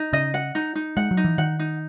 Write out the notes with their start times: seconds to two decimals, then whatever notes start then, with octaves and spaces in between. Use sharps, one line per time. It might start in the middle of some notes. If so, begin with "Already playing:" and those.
Already playing: D#4
0.13 C#3 D#5
0.34 F#5
0.55 D#4
0.75 D#4
0.97 G#3 F#5
1.11 F#3
1.17 D#4
1.24 E3
1.38 D#3 F#5
1.59 D#4